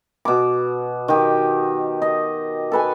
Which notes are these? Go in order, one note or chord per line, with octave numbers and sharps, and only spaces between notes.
B2 D6
D#3 G4
D#5
A4 B4 G#5